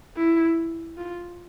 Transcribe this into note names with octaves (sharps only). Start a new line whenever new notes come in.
E4
F4